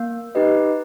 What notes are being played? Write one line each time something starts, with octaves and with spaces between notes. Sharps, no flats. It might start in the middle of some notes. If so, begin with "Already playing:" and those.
Already playing: A#3
D#4 G4 B4 D#5